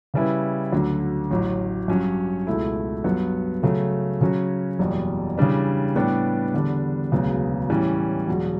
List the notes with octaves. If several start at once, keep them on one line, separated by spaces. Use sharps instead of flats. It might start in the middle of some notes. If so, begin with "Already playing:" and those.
C#3 G3 C#4 E4 B4
D2 D3 F#3
A1 A2 F#3
G2 F#3 C#4
C#2 B2 A3 E4
G2 F#3 B3
C#3 F#3 A3
C#3 F#3 C#4 F#4
F#1 E2 B2 G3
C#3 E3 G3 D4
A2 G3 B3 D4 G4
E2 D3 G3 B3 D4
E1 D2 C#3 F#3 B3
A2 E3 G3 C#4
E1 E2 B2 F#3